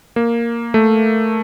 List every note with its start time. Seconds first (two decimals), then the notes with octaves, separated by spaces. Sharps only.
0.16 A#3
0.74 A3